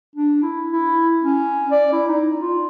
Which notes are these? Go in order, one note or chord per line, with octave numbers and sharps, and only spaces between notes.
D4
E4
E4
C#4
D5
E4
D#4
F4